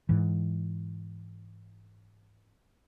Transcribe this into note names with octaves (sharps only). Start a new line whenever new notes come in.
G#2 E3